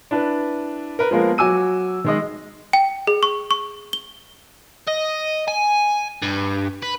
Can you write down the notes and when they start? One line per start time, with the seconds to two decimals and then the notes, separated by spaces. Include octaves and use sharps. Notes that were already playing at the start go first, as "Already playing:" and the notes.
0.11 D4 E4 B4
0.99 A#4 B4
1.11 F3 G#3 A#3 B3 A#4
1.38 F#3 F#4 G#5 D6 E6 D#7
2.05 D#3 G#3 D#5
2.73 G5
3.07 G#4
3.23 C#6
3.51 C#6
3.93 G7
4.87 D#5
5.48 G#5
6.22 G2
6.83 B4